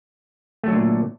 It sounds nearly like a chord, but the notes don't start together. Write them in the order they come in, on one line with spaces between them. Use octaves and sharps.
A3 F#3 D3 A#2